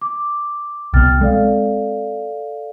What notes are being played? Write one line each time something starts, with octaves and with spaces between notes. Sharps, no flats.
D6
C2 B2 B3 G5 F6 A6
G#3 C4 A4 D5 F5